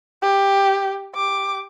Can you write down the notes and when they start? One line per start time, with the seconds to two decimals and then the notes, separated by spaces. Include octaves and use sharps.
0.22 G4
1.15 G4 D6